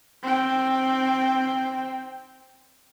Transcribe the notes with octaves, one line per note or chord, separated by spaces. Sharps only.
C4 G5